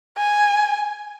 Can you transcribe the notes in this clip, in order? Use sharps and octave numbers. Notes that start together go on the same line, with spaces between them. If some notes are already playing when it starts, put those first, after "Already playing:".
G#5